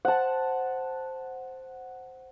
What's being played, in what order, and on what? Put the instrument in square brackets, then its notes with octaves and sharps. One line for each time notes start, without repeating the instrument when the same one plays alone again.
[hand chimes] C5 [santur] F#5 A5